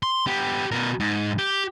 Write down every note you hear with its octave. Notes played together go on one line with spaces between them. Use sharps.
C6
B3 G4
B2 A#4
G#2
G4